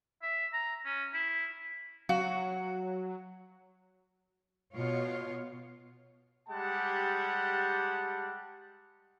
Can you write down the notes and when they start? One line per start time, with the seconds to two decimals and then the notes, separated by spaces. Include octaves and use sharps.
0.22 E5
0.53 A#5
0.85 C#4
1.14 E4
2.09 F#3 F#4 F5
4.74 B2 F4 C#5
6.49 G3 G#3 G4 F#5 G5 A5